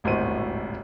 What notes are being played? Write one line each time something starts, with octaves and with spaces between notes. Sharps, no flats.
D#1 G#1 D2 A2 C5 D#7